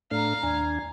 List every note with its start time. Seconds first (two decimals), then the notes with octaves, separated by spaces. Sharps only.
0.11 A2 A3 D4 F5 A#5
0.43 D#2 D4 G#5